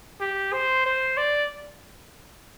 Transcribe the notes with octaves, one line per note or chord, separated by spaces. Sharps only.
G4
C5
C5
D5